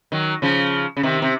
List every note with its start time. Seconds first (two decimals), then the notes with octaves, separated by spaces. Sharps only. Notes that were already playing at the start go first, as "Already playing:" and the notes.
0.12 D#3 F#3
0.42 C#3 F3
0.97 C#3
1.03 C3 D#3
1.22 C3